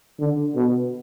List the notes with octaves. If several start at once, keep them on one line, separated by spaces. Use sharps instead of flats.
D3
B2